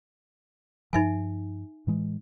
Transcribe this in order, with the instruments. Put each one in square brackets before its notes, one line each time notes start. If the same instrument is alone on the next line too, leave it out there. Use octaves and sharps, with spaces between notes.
[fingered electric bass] G2 F3 [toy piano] D#4 E5 G#5
[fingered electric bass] A2 E3 G#3